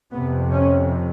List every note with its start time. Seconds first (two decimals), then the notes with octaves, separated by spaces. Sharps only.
0.12 F2 C3 B3
0.52 C#4